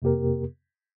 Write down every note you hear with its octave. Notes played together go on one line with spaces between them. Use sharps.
F2 C3 A#3 G4 A#4